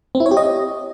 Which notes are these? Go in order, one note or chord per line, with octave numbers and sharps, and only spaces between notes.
C4
E4
C#5
G4
D#5